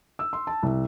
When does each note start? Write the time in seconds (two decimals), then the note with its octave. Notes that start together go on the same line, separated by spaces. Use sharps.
0.19 E6
0.33 C6
0.47 A5
0.63 C2